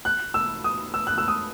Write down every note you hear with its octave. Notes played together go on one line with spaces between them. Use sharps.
F#6
E6
D#6
E6
F#6
E6
D#6